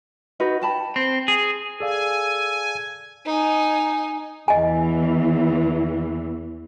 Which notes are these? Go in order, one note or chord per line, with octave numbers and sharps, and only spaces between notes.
D#4 F#4 B4
G5 A5 B5
C4
G#4
G#4 A4 D5 F5 G#5
D#4 G#5
E2 E3 D#5 G#5